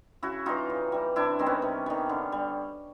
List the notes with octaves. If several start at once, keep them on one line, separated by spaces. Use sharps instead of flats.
C#3 E4 F#4
E3 G3 D#4 F4
C#3
E3 G3
C3 D4 E4
D#3 G3 C4
B3 C#4
C3
D#3 G3
D3
G3